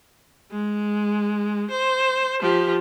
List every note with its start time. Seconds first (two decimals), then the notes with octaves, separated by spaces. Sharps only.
0.51 G#3
1.70 C5
2.41 F3 G4